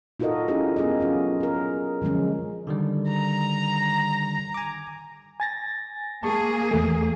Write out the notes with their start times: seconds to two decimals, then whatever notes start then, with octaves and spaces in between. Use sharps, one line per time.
0.20 D#4 F4 F#4 A4 A#4 D#5
0.48 C#4 E4 F4 G4 G#4 A#4
0.76 B3 C#4 G#4 A#4 D#5
1.00 F#3 C#4 F4 F#4
1.41 G#4 A#4
2.02 D3 F3 F#3 G#3 C#4
2.67 D3 D#3 G3
3.10 A#5
4.54 G#5 D6
5.40 G#5 A6 A#6
6.23 A#3 G#4 A5 C#6
6.71 E2 A3